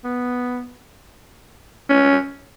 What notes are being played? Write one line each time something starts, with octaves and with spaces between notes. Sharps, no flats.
B3
C#4